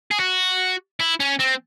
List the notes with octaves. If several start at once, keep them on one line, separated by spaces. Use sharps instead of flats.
G#4
F#4
E4
C#4
C4